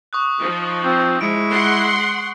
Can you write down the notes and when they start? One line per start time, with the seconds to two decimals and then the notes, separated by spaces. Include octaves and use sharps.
0.13 C#6 D#6 F#6
0.41 F3 D#4
0.84 C4
1.21 G#3 E4 D7
1.52 F#5 C6